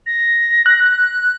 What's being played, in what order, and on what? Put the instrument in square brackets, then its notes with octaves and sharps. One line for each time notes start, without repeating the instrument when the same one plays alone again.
[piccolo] A#6
[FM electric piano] F#6